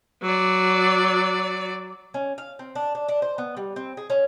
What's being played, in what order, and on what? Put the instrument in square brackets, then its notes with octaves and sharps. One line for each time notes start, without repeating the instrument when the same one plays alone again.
[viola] F#3 D5
[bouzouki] C#4
F5
C4
D4
D4
D4
C5
B3
G3
C4
G#4
C#4